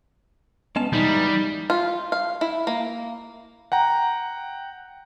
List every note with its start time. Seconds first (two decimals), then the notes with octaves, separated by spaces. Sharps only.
0.76 G#3 B3 C#4 A5
0.93 E3 G3 G#3 B3 D#4
1.70 F4
2.12 F5
2.41 E4
2.67 A#3
3.72 F#5 G5 A#5